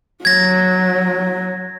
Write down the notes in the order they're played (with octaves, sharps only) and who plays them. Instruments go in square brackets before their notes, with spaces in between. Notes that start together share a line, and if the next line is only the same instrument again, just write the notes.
[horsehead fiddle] F#3 [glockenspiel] G#6 A#6